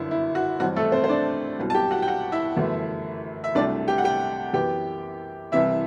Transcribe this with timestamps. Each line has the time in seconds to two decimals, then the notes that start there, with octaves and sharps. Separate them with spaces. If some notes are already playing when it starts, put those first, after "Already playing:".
Already playing: G1 F#2 F#3 B3 D4 E4
0.11 E4
0.35 F#4
0.59 A1 G2 F#3 C4 F#4
0.76 A3 A4
0.92 C4 C5
1.04 C5
1.09 D4 D5
1.59 C2 B2 F#3
1.70 A5
1.74 G4 G5
1.91 F#4 F#5
2.02 G5
2.08 F#4 F#5
2.32 E4 E5
2.57 G1 F#2 E3 A3
3.44 E5
3.55 C2 C3 F#3 A3 D4 D5
3.88 G4 G5
3.98 F#5
4.04 G4 G5
4.53 F#2 E3 B3 G4 G5
5.52 C2 C3 E3 E4 E5